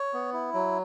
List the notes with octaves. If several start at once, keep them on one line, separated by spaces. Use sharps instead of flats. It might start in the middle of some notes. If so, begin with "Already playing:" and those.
Already playing: C#5
B3
E4
F#3